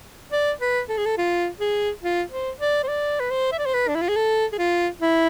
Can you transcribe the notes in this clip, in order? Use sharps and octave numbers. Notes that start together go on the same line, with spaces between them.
D5
B4
A4
G#4
A4
F4
G#4
F4
C5
D5
C5
D5
B4
C5
E5
D5
C5
B4
D4
E4
F4
G#4
A4
G#4
F4
E4